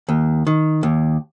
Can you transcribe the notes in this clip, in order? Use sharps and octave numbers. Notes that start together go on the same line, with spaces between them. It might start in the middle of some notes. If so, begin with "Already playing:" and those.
D#2
D#3
D#2